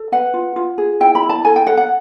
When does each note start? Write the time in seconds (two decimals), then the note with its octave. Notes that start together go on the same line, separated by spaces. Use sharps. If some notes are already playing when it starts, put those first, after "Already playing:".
Already playing: A4
0.12 B4 F#5
0.34 F4
0.56 F4
0.78 G#4
1.00 E4 G5
1.15 B5
1.22 E4
1.29 A5
1.45 A4 G#5
1.56 G5
1.67 A4 F#5
1.77 F#5